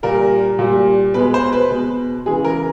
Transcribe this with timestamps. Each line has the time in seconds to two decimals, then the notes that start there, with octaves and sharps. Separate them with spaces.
0.03 A#2 G3 A#4
0.59 A#2 G3
1.14 B2 G#3 B4
1.34 C5
1.53 B4
1.70 B2 G#3
2.26 C#3 E3 G#3 G#4
2.45 A#4